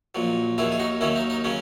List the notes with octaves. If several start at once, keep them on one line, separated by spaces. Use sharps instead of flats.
A#1 A#2 F#3
D#2 D#3 F#3 E4 G#4
G#4
D#4 F#4
D#2 D#3 F#3 C#4 E4
D#4
D#4
C#3 F#3 C#4